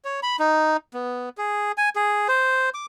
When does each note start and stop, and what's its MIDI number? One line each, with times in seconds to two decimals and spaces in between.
0.05 0.20 73
0.23 0.36 83
0.39 0.77 63
0.94 1.29 59
1.38 1.72 68
1.78 1.89 80
1.96 2.28 68
2.28 2.69 72
2.74 2.86 86